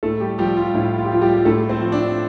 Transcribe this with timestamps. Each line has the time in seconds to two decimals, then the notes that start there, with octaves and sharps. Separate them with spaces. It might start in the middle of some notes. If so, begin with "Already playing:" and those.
0.03 A2 A3 A4
0.20 G3 G4
0.38 F3 G3 G4
0.57 F4
0.74 A2 E4
0.98 F4
1.05 G4
1.09 F3 F4
1.22 G3 G4
1.34 G4
1.45 A2 A3 A4
1.69 C4 C5
1.80 F3
1.92 D4 D5